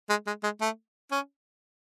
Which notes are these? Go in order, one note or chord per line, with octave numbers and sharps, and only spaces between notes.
G#3
G#3
G#3
A3
C#4